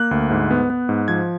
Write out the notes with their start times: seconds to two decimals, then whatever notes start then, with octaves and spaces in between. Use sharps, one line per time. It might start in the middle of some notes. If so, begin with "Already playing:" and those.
Already playing: A#3 F#6
0.11 D2
0.31 G#2
0.51 B3
0.70 B3
0.89 G#2
1.08 F3 G#6